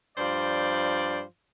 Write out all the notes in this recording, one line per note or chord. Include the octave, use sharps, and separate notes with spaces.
G2 F3 C5 D5